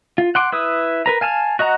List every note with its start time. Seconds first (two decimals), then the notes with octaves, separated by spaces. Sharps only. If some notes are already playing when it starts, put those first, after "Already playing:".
0.18 F4
0.35 F#5 C6 D6
0.52 E4 B4 D#6
1.06 A#4 B4 A#5
1.21 F5 G#5 A5 F6
1.59 F#4 D#5 F#5 A#5